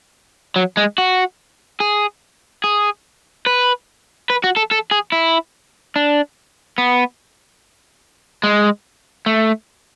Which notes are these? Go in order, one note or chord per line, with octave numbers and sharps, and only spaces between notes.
F#3
G#3
F#4
G#4
G#4
B4
B4
F#4
A4
A4
G#4
E4
D4
B3
G#3
A3